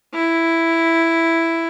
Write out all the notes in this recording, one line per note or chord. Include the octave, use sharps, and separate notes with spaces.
E4